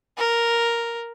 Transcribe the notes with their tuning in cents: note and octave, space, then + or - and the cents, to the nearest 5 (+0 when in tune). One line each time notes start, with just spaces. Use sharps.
A#4 +0